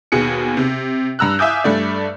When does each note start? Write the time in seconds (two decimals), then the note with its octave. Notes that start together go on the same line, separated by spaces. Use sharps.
0.12 D#2 B2 G#4 C#7
0.57 C3
1.19 G2 A#5 E6 F#6
1.39 E5 F5 G#5 D6 D#6 G6
1.64 G2 A3 D5